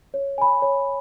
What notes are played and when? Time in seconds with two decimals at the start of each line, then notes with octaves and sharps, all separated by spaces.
0.14 C#5
0.38 G#5 B5
0.62 C#5